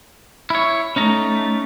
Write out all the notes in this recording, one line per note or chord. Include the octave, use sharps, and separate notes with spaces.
E4 C#5
A3 C#4 D#4 A#5